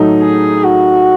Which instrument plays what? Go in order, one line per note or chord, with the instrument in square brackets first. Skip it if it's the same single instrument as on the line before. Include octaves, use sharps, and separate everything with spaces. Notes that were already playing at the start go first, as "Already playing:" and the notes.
Already playing: [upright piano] A2 F#3 A3 D#4
[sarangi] G#4
F#4